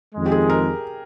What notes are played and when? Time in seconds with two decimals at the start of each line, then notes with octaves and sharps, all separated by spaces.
0.14 F2 D#3 G#3
0.26 G4
0.32 G#4
0.50 A#4